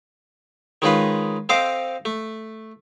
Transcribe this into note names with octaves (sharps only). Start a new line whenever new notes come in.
D#3 G#3 C#4 D#4 F4 B4
C4 A4 C5 D#5 F5 D6
A3